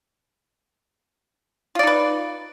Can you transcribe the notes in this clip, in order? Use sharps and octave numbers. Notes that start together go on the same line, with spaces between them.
D#4 F4 B4 D5